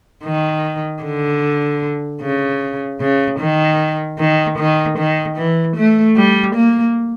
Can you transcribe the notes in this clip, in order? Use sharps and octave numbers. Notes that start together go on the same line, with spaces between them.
D#3
D3
C#3
C#3
D#3
D#3
D#3
D#3
E3
A3
G3
A#3